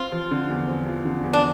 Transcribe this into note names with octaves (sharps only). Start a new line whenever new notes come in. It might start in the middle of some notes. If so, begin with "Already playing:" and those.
Already playing: C4 F4
F3
D3
E2
C4
F3
D3
E2
D4